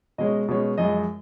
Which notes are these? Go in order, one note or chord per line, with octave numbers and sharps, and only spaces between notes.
B2 G#3 C#4 D#5
B2 G#3 C#4
F#2 F3 G#3 D#5